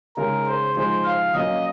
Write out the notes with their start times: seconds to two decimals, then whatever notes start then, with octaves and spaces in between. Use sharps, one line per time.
0.17 C#3 G#3 D#4 G#4 A#4
0.46 C5
0.75 F3 G#3 D#4 G#4 C5
1.05 F5
1.34 F#3 A#3 C#4 D#5